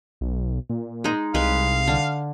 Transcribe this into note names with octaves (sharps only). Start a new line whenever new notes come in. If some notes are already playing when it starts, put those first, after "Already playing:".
B1
A#2
G#3 D#4
C2 G#3 B4 F5
D3